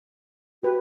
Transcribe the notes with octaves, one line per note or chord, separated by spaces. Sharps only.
F#4 G4 B4